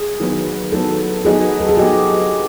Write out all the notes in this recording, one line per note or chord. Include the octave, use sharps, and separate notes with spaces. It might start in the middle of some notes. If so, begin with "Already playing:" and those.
Already playing: G#4
D#3 F#3 B3
D#3 F#3 B3 A4
F#3 B3 D#4 F#4 G#4
A4
G#4
F#3 B3 D#4 F#4 G4